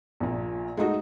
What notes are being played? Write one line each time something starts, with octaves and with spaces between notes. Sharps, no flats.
A#1 A#2
G#3 A3 D#4 F#4